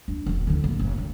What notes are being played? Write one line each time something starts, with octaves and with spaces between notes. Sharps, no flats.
D4
E1 A1
D3 E3
A#1
F#1 G2
E1